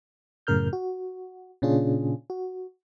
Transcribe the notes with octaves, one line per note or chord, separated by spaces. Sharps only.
F#2 A2 C#3 A#4 F6 G6
F#4
A#2 C#3 C#4 D4 F4 G#4
F#4